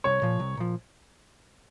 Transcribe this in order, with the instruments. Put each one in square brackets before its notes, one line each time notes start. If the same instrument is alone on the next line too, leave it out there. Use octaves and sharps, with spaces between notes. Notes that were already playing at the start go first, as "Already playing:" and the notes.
[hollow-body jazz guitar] C2 [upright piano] C#5
[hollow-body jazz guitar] A#2 F3
C2
A#2 F3